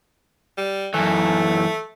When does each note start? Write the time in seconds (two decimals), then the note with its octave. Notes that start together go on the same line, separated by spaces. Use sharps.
0.58 G3
0.94 F#2 E3 A3